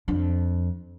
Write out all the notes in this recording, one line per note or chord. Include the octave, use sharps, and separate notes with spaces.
F2 D4